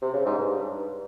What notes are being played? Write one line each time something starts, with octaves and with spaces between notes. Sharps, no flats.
C3
C#3
G#2
G2